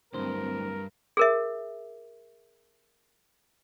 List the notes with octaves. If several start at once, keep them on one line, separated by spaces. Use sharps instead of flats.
D1 D2 G2 C4 A#4 C5
G#4 A#4 E5